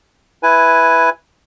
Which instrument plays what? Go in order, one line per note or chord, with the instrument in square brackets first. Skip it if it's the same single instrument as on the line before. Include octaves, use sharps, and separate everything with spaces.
[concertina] E4 B4 G#5